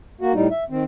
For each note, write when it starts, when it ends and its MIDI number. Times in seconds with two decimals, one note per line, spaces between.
0.21 0.33 58
0.21 0.33 66
0.34 0.48 45
0.34 0.48 55
0.34 0.48 63
0.51 0.64 76
0.70 0.84 51
0.70 0.84 60